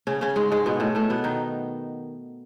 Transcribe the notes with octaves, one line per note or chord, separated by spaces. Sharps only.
C#3 C#4
C#3 C#4
G#2 G#3
G#2 G#3
B2 B3
A2 A3
A2 A3
B2 B3
D#3 D#4